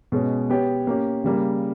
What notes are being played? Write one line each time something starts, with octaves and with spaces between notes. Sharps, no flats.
B2 G#3 C#4
B3 G4 C#5
A#3 C#4 G4
C#3 G3 A#3